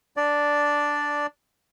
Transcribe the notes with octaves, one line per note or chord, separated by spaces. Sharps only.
D4 D5